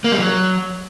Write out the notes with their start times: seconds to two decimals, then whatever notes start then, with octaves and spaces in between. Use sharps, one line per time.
0.04 A#3
0.12 G3
0.19 F#3